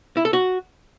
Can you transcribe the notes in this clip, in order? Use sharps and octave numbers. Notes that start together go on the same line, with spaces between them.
E4
A4
F#4